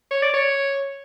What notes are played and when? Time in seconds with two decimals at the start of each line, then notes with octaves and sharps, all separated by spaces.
0.11 C#5
0.22 D5
0.34 C#5